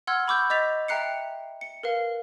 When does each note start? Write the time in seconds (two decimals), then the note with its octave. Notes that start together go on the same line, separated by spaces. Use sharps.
0.07 F#5 C6 E6 F6 G#6
0.28 B5 C#6 D6 E6 G6
0.50 D#5 D6 G6 A6 B6 F7
0.88 E5 G5 A#5 F#6 C7 C#7
1.61 C#7
1.83 A#4 B4 F5